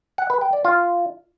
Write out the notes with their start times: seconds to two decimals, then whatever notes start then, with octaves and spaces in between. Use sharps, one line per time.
0.18 F#5
0.30 B4
0.41 G5
0.53 D5
0.65 F4